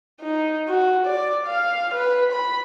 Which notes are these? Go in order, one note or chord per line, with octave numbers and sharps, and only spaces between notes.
D#4
F#4
D5
F5
B4
B5